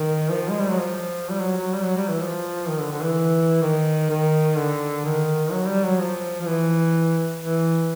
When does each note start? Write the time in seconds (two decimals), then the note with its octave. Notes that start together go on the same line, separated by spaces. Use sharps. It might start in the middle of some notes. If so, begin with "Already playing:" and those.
Already playing: D#3
0.31 F3
0.50 G#3
0.60 G3
0.69 F#3
0.78 F3
1.31 G3
1.41 F#3
1.58 F#3
1.73 G3
1.84 F#3
1.97 G3
2.08 E3
2.21 F3
2.68 D#3
2.80 D3
2.92 D3
3.03 E3
3.62 D#3
4.10 D#3
4.57 D3
5.05 D#3
5.52 F#3
5.67 G3
5.84 F#3
5.99 F3
6.42 F3
6.47 E3
7.41 E3